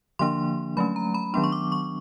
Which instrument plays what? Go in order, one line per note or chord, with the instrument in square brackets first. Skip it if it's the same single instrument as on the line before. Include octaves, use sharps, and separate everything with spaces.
[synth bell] D3 F3 A#3 D4 C6
F#3 A3 C#4 B5
A#5
B5
D#3 F#3 B3 D4 C6
C#6
D6
C#6